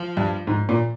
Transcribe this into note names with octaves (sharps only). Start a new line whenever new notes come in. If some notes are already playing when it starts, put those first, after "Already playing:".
Already playing: F3
G2
G#2
A#2